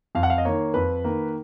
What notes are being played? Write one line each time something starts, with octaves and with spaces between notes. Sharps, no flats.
F2 F5
F#5
F5
D#5
D#3 A#3 C#5
F2 B4
D#3 A#3